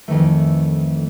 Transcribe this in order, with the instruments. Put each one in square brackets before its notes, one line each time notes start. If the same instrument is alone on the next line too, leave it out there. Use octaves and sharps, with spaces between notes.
[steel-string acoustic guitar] F2 D#3 E3 A3